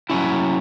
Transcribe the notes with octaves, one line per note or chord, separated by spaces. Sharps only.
F#3 C#4 E4